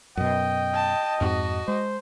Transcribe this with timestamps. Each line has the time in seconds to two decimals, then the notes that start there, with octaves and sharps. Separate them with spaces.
0.17 F#2 B2 D#5 G5
0.75 A5
1.21 F2 G#2 F#4
1.68 G#3 C5